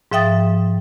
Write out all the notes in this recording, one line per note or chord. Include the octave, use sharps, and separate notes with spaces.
G#2 F3 E5 G5 D#6 A6